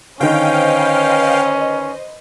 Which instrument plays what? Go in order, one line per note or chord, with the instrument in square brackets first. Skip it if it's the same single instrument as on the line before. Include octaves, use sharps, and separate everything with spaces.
[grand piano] D3 D#3 [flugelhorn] C#4 [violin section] B4 C5 D#5 [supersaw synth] F5 G5